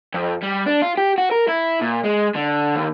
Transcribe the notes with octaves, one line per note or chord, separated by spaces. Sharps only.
F2
G3
D4
F4
G4
F#4
A#4
E4
A#2
G#3
D3
D#2